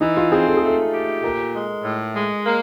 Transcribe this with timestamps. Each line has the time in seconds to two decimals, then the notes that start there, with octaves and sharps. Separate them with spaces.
0.01 E3 D#4
0.17 F4
0.32 C4 G#4
0.47 A4
0.57 G#4
0.63 A3
0.68 A4
0.92 G4
1.23 A#2 A#4
1.54 G#3
1.84 A2
2.15 G#3
2.45 A#3